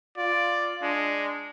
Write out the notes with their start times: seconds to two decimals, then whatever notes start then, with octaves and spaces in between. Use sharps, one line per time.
0.17 F4 D5
0.82 G#3 D4